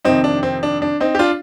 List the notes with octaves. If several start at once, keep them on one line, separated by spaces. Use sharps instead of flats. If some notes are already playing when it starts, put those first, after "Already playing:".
F2 C3 D#3 C4 D#4
D4
C4
D4
D4
C4 D#4
G4
D4 F4